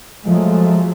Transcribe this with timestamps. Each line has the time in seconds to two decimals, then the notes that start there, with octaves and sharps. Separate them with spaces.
0.25 F3 F#3 G#3 A3